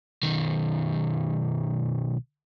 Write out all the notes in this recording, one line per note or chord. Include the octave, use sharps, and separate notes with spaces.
B1 D#3